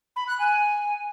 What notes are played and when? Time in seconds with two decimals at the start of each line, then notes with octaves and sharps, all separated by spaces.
0.16 B5
0.27 F#6
0.39 G#5